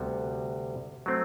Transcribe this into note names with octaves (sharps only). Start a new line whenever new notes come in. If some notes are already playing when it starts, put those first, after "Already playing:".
Already playing: D2 C3 G3 B3 F#4
F#3 A3 C4